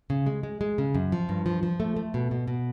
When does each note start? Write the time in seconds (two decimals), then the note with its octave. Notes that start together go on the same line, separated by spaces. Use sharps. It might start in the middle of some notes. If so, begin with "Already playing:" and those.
0.10 C#3
0.26 G#3
0.43 G#3
0.61 G#3
0.78 C#3
0.95 F#2
1.12 F3
1.29 G2
1.46 F3
1.63 F3
1.80 A3
1.96 A3
2.14 B2
2.31 B2
2.48 B2